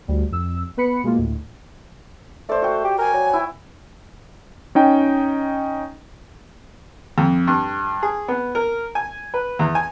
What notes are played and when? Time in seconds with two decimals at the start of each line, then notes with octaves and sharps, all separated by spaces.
0.08 D2 G3
0.31 F2 E6
0.77 B3 B4 B5 C#7
1.03 B2 G#3 A#3 F4
1.18 D2 A2
2.49 A3 C5 D5
2.62 F#4 G5
2.84 G4
2.99 A#4 G#5
3.14 F#3
3.33 E4
4.75 C#4 D#4 G5
7.18 F2
7.47 G2
8.03 G#4
8.28 B3
8.55 A#4
8.95 G#5
9.34 B4
9.59 E2
9.75 G#5